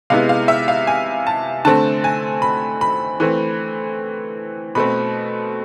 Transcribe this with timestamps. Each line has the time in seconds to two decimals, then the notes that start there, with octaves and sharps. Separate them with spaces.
0.10 C3 G#3 B3 E4 F5
0.29 F5
0.48 E5
0.68 F5
0.87 G#5
1.27 A5
1.65 D3 A3 C4 A5
2.04 G#5
2.42 B5
2.81 B5
3.20 E3 A3 C4
4.75 B2 A3 C4 B5